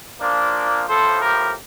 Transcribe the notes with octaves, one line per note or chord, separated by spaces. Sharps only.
A#2 F3 A#3 D4
A2 F3 A4 C5
G4 A#4